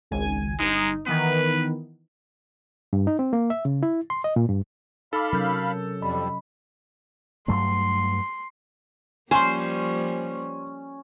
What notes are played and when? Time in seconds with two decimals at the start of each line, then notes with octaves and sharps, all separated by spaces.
0.11 G#1 C#2 G#5
0.59 G1 G#3 D#4
1.06 D#3 E3 B3 B4
2.93 G2
3.07 D#4
3.19 C4
3.33 A#3
3.50 E5
3.65 C#3
3.83 E4
4.10 C6
4.24 D#5
4.36 A#2
4.49 G2
5.13 D#4 A4 F5 B5 D6
5.33 C3 F#3 C#4 A#4 G6
6.02 F2 G3 D#5 B5
7.48 G2 F#3 A3 C6
9.31 F3 G3 A#3 C#4 C5 G#5 C6